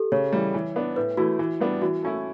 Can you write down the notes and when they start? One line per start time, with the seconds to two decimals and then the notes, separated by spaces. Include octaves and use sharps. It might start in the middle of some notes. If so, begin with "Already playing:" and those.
Already playing: G4 A4
0.12 C#3 C#5
0.33 E3 G3
0.54 E3
0.76 B3 D4
0.96 A2 B4
1.17 E3 A3 E4 F#4
1.39 E3
1.60 G3 B3 D4
1.82 E3 F#4
2.02 A3 C#4 E4